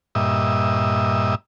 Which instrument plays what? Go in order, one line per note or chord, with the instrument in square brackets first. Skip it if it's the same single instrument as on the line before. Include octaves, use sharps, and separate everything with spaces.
[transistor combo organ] G2 A#2 D#5 E5